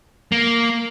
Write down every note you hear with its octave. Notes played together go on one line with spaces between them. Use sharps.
A#3